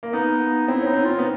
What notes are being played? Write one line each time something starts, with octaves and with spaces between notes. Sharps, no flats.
A#3
B3 D#4
C4 E4
C#4
D#4
C4
F4
B3